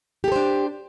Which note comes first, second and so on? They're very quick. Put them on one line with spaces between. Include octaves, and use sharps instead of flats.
G4 A4 C5 D4